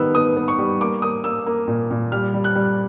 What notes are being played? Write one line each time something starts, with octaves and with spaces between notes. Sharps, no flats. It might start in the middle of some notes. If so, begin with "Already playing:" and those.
Already playing: D#3 G3 B3 E6
B3 D#6
B3
C#6
G3
A#3 D6
A#3 D#6
A#3 E6
A#3
A#2
A#2
G3 F6
G3
F#6
G3